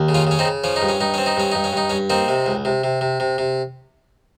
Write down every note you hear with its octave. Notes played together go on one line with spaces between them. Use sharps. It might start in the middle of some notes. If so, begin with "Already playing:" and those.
Already playing: D#2
C#3
C#4 F4
C#3 C#4
C4 D#4
C#3
F3 C#4
D#4
G2
C#4
G2 D#4
C4 C#4
D#4
G2 C#4
G2 D#4
C#4
G2 D#4
G2 C#4
A#3 C4 D#4
C3
C#2
C3
C3
C3
C3
C3